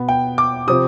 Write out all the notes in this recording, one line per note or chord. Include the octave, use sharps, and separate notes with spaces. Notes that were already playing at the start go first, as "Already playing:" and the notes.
Already playing: B2 B3
G5
D6
C3 F3 C4 D#6